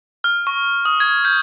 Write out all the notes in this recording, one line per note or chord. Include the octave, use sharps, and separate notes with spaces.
F6
C#6
D#6
G#6
G6